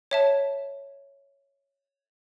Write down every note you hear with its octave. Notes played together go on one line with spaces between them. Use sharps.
C#5 E5 A5